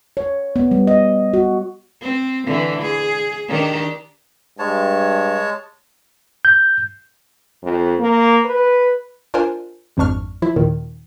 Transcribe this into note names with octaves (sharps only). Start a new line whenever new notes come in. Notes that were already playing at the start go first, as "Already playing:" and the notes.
C#5
B3
G3
D#5
F#4
C4
D3 E3
G#4
D#3 D4 G4
G2 G#3 C#5 A5
G6
F2
A#3
B4
D4 F4 A#4 C5 G#5
G#1 F2 G#2 D4 C#6 F6
F3 E4
D#2 A#2 D#3